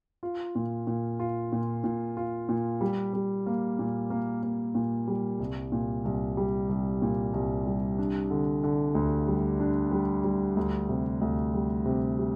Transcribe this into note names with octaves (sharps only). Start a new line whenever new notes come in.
F4
A#2
A#2
F4
A#2
A#2
F4
A#2
G3
G3
A#3
A#2
A#3
A#3
A#2
G3
C2
A#2
C2
G3
C2
A#2
C2
G3
D4
D3
D3
D2
G3
D4
G3
G3
D2
C3
D2
G3
C3
G3